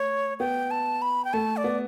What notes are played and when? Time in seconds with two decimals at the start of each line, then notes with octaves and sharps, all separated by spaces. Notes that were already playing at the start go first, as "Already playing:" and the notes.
Already playing: A3 C#5
0.40 B3 G5
0.71 A5
1.02 B5
1.25 G5
1.33 A3 A5
1.57 D5
1.64 B3